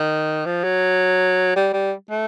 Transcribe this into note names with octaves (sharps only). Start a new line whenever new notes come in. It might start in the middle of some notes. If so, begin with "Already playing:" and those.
Already playing: D#3
F3
F#3
G3
G3
A3